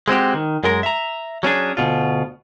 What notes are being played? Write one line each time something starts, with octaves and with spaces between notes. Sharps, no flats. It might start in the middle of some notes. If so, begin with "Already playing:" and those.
G#3 C4 F#4 G4
D#3
F#2 G#3 A#4
E5 A#5
F#3 C#4 D4 G#4
D2 B2 F4